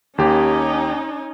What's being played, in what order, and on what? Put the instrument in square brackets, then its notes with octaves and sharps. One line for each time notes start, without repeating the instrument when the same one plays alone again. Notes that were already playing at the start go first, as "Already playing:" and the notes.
[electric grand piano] D#2 G4 [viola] C#4 D#4